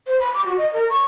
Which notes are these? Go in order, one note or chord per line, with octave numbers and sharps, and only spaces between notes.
C5
B5
D6
F#4
D#5
A#4
C#6